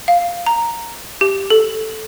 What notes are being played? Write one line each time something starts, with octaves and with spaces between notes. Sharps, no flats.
F5
A#5
G4
A4